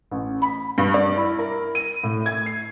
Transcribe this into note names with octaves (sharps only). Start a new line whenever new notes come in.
A1
B5
G2
D5
E4
A#4
D#7
A2
G#6
C7